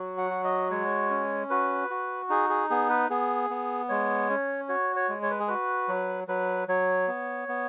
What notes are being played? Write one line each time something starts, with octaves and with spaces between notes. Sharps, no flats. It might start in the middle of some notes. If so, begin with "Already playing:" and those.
Already playing: F#3 F#4
F#5
F#4
D#5
G#3 C#5
C#4
F#4 B4
F#4
D#4 G#4
G#4
B3 G#4
B4
B3 G#4
B3
G#3 C#5
C#4
F#4 C#5
C#5
G#3
C#5
B4
G#4
F#4 B4
F#3
F#3 B4
F#3 C#5
B3
B3